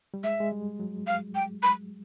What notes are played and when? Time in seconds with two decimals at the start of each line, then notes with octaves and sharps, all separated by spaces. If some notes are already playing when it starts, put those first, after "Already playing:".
0.14 G3
0.24 G#3 E5
0.40 G#3
0.52 G3
0.80 F#3
1.07 F5
1.35 G5
1.63 B5